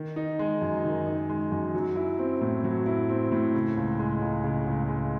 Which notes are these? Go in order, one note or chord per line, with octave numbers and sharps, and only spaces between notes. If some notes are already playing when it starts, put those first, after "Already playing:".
Already playing: D#3
D#4
G#3
F#2
D#3
D#4
G#3
F#2
F#3
E4
C4
A2
F#3
E4
C4
A2
C#3
C#2
G#3
C#2
C#3
C#2
G#3